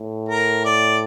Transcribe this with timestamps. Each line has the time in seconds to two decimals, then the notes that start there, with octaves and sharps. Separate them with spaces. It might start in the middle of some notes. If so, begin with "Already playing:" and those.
Already playing: A2
0.29 A#4
0.65 D5